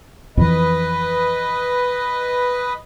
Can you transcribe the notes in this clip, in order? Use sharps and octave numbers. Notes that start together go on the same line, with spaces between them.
F2 E3 B4 D#5